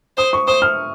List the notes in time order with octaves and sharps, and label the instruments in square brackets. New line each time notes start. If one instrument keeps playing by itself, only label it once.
[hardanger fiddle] C5 [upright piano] D#6
[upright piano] C#6
[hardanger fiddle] C5 [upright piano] D#6
[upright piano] F6